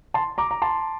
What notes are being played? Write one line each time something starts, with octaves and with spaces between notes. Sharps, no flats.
A5 C6
A#5 D6
A#5
A5 C6